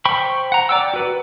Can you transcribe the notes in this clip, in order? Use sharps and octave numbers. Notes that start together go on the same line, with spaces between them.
C5 G5 B5 C#6
F#5 A#5
D5 G5 E6
F#4 B4